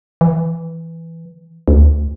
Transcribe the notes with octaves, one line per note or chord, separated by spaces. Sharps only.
E3
D2